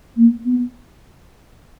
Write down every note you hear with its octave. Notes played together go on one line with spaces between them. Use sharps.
A#3
B3